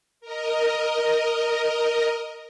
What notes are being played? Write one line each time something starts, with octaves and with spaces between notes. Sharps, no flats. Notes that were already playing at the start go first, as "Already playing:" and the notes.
A#4 D#5